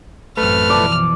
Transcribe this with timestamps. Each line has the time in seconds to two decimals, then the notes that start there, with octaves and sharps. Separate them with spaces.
0.37 A1 F#2 A3 C4 B4 F6
0.70 B2 E3 F3 D5 A5